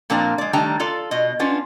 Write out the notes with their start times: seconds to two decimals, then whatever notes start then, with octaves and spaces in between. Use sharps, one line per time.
0.10 A#2 F3 A#3 C4 D4 A#5
0.38 G#3 D5
0.53 D#3 G3 A3 D4 G5 A#5
0.80 F4 A4 D5
1.11 B2 D#5
1.39 B3 C#4 D4 F4